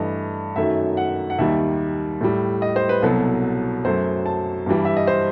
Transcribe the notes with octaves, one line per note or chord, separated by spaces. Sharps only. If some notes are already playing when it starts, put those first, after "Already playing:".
Already playing: G2 E3 A3 D#5
F#2 D#3 F#3 A3 E5
F#5
F#5
D#2 D#3 G3 E5
A2 G3
D#5
C5
B4
C2 B2 F#3 A4
F#2 F#3 A3 C5
A5
G2 E3 G3
E5
D#5
C5